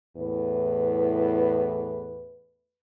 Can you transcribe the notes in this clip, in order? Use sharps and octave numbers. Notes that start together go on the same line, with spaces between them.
E2 A2 B4